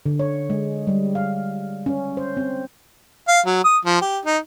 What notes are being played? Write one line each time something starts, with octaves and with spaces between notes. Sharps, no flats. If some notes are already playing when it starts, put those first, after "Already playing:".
D3
C#5
G#3
G3
F5
C#4
C5
C4
F5
F#3
D#6
F3
G4
D#4